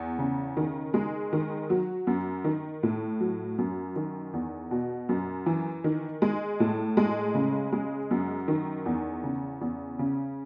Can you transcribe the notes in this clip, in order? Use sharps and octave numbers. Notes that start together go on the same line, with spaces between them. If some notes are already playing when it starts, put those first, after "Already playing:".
Already playing: E2
C#3
D#3
G#3
D#3
F#3
F#2
D#3
A2
F#3
F#2
D#3
E2
B2
F#2
E3
D#3
G#3
A2
G#3
C#3
G#3
F#2
D#3
E2
C#3
E2
C#3